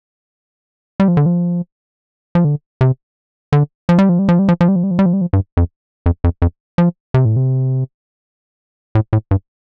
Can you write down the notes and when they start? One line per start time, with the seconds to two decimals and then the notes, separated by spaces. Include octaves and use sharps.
1.00 G3
1.08 F3
1.17 D3
1.26 F3
2.35 F3
2.44 D3
2.81 C3
3.53 D3
3.89 F3
3.99 G3
4.09 F3
4.19 G3
4.29 F3
4.39 G3
4.49 F3
4.61 F3
4.68 G3
4.76 F3
4.84 G3
4.91 F3
4.99 G3
5.06 F3
5.13 G3
5.21 F3
5.33 G2
5.57 F2
6.06 F2
6.24 F2
6.42 F2
6.78 F3
7.14 C3
7.25 A2
7.36 C3
8.95 A2
9.13 A2
9.31 G2